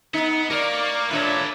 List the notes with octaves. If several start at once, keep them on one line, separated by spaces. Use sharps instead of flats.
B3 D#4
A#3 A#4 D5 C#6
A#2 D4 A4 B4 C#5 E5